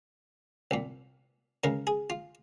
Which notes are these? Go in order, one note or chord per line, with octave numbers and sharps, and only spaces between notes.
C2 A#2
C#2 C#3 A#4
G#4
F4